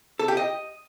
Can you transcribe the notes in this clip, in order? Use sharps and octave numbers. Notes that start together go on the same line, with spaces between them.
A4
G4
D#5